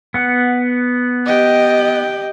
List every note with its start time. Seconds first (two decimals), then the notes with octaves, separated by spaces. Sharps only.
0.14 B3 F#5
1.26 G4 D#5 G5